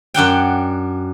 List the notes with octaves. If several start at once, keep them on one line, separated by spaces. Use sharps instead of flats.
F#2 D4 F#5 G5